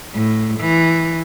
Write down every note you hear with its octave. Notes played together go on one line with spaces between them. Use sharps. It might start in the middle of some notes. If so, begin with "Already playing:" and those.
A2
E3